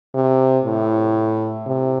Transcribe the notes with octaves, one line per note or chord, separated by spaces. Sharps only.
C3
A2
C3